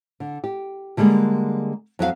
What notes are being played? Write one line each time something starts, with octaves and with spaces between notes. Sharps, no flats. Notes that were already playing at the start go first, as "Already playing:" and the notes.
D3
G4
D3 G3 G#3 A#3 G#4
F2 F#3 G#4 F5